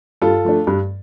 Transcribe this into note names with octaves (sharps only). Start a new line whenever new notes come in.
G2 F4 A4
F3 A3 D4
G2